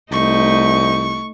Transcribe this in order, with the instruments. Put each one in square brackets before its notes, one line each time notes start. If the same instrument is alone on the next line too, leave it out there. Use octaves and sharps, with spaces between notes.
[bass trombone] C2 [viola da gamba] A3 D#4 [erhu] C#6